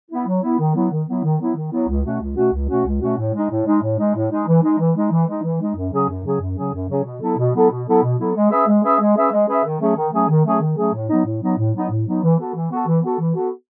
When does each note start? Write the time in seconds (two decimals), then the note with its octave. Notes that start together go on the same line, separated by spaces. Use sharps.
0.10 B3 E4
0.27 F#3
0.42 B3 E4
0.59 D#3
0.75 F#3 B3 E4
0.91 D#3
1.07 F#3 B3 E4
1.23 D#3
1.39 F#3 B3 E4
1.56 D#3
1.72 F#3 B3 E4
1.88 C#2
2.04 B2 A3 C#4 F#4
2.21 C#2
2.36 B2 A3 C#4 F#4
2.52 C#2
2.69 B2 A3 C#4 F#4
2.85 C#2
3.01 B2 A3 C#4 F#4
3.18 A2
3.34 G#3 D#4
3.50 A2
3.66 G#3 D#4
3.82 A2
3.98 G#3 D#4
4.15 A2
4.31 G#3 D#4
4.47 E3
4.63 G#3 D#4
4.79 E3
4.96 G#3 D#4
5.11 E3
5.27 G#3 D#4
5.43 E3
5.60 G#3 D#4
5.75 F#2
5.92 C#3 F#3 C#4 G#4
6.08 F#2
6.24 C#3 F#3 C#4 G#4
6.40 F#2
6.57 C#3 F#3 C#4 G#4
6.73 F#2
6.89 C#3 F#3 C#4 G#4
7.05 B2
7.21 F#3 B3 E4 A4
7.37 B2
7.54 F#3 B3 E4 A4
7.70 B2
7.87 F#3 B3 E4 A4
8.03 B2
8.19 F#3 B3 E4 A4
8.35 G#3
8.50 C#4 G#4 B4 E5
8.67 G#3
8.83 C#4 G#4 B4 E5
8.99 G#3
9.15 C#4 G#4 B4 E5
9.32 G#3
9.48 C#4 G#4 B4 E5
9.64 D#3
9.80 F#3 A3 C#4 G#4
9.96 D#3
10.12 F#3 A3 C#4 G#4
10.28 D#3
10.45 F#3 A3 C#4 G#4
10.61 D#3
10.77 F#3 A3 C#4 G#4
10.94 A2
11.09 F#3 B3 D#4
11.25 A2
11.42 F#3 B3 D#4
11.58 A2
11.74 F#3 B3 D#4
11.90 A2
12.06 F#3 B3 D#4
12.23 E3
12.39 B3 F#4 A4
12.54 E3
12.71 B3 F#4 A4
12.87 E3
13.03 B3 F#4 A4
13.19 E3
13.35 B3 F#4 A4